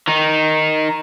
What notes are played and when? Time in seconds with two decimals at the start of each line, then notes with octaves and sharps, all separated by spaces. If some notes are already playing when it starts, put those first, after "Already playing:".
0.08 D#3 D#4